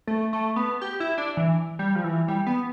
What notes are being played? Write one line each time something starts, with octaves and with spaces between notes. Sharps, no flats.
A3
A3
B3
G4
E4
D4
E3
G3
F3
E3
G3
B3